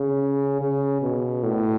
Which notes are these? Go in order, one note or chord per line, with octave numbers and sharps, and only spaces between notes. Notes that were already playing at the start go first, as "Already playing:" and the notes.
Already playing: C#3
C#3
B2
A2